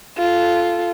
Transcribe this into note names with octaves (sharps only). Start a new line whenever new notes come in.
F4 A4